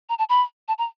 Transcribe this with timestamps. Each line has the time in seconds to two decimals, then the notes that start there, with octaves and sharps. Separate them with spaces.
0.09 A#5
0.19 A5
0.29 B5
0.68 A5
0.78 A#5